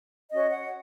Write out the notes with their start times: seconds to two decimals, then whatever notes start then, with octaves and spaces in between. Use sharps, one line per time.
0.31 C#4 F#4 C#5 D#5
0.51 F#5